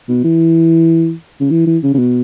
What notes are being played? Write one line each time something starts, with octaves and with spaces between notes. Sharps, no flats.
B2
E3
C#3
E3
E3
C#3
C#3
B2